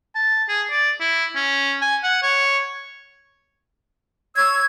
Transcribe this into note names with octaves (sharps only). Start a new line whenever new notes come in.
A5
G#4
D5
E4
C#4
G#5
F#5
C#5
C#5 E6 G#6